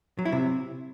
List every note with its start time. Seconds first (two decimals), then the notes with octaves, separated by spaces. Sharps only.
0.19 F#3
0.25 E4
0.32 C3